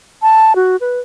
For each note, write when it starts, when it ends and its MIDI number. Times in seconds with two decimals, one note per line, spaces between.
0.22 0.56 81
0.56 0.76 66
0.81 1.00 71